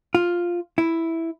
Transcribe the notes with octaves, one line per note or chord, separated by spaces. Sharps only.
F4
E4